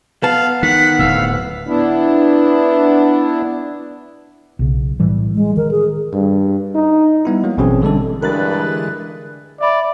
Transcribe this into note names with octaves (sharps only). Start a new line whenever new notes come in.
B3 F5 A5
D#3 F#5 B6
D1 A2 F5 E6
B3 D4 E4
B1 C#3
A2 E3 G3
G#3
D#3 A#4
G#4
G2
D#4
G3 B3 E4
F#3 A#3
A1 B2 E3 C4 C#4 G#4
D3 G3 G#3 D4 A4
G2 D3 E3 G#3 A#4 B4 F#6 A6
D5 E5 B5